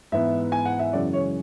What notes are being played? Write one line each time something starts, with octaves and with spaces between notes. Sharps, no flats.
G#2 E3 B3 E5
G#5
F#5
E5
F#2 C#3 E3 G#3 D5
C#5